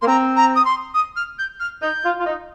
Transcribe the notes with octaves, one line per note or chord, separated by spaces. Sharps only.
A#3 C6
C4 A#5
A#5
D#6
C6
D#6
F6
G6
F6
D#4 G6
F4
F4
D#4